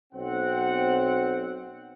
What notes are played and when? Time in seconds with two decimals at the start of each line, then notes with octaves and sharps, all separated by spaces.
0.13 B1 C4 F#5